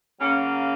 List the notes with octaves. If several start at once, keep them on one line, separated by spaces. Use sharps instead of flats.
C#3 F#3 A#3 C#4